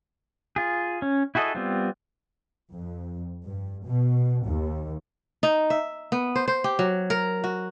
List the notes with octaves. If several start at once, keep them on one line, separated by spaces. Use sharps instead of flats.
F4 G#4
C#4
E4 F#4 G#4 A4 D#5
G3 B3 C4 F4
F2
G2
B2
D#2
D#4
E5
B3
C5
C5
G4
F#3
A#4
F#4